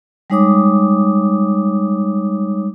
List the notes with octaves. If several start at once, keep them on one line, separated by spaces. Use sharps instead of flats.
G3 G#3 D#4 C#5 D6 D#6